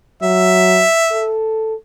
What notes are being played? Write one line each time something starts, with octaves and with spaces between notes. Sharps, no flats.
F#3 E5
A4